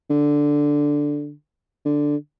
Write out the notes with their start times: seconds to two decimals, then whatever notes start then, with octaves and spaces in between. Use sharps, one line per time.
0.10 D3
1.85 D3